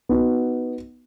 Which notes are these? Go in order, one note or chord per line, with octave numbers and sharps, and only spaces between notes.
B3 D#4 F#4